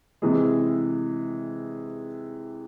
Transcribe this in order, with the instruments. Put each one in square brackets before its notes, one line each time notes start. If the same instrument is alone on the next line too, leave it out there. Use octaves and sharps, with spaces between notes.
[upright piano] C3 E3 G#3 G#4